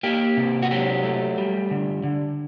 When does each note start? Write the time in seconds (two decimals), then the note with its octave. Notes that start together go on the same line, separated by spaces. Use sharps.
0.03 A#3 G4
0.37 C3
0.62 F#4
0.71 F#3 G4
1.04 A3
1.38 G3
1.71 D3
2.04 D3